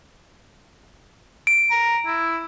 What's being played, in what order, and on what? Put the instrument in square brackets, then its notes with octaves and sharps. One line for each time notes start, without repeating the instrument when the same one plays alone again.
[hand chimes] D7
[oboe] A#5
E4